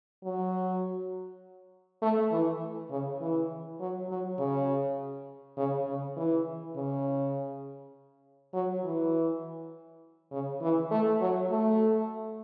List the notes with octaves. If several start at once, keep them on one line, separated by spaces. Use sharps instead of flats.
F#3
A3
E3
C#3
E3
F#3
F#3
C#3
C#3
C#3
E3
C#3
F#3
E3
C#3
E3
A3
F#3
A3